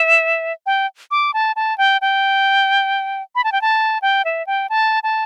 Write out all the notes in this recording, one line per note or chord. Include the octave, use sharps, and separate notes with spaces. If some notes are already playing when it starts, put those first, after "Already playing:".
Already playing: E5
G5
D6
A5
A5
G5
G5
B5
A5
G5
A5
G5
E5
G5
A5
A5